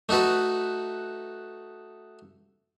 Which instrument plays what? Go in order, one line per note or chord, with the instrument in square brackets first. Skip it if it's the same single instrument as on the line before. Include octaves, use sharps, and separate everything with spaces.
[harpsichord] A3 D#4 F#4 A4 B4